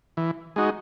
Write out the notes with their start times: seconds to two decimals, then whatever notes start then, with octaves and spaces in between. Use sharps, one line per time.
0.17 E3
0.56 G#3 D#4 F#4